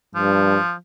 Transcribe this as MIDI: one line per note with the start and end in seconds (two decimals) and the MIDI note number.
0.15 0.58 43
0.15 0.75 53